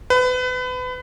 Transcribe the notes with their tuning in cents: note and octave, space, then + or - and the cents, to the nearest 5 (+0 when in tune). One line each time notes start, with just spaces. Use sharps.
B4 +30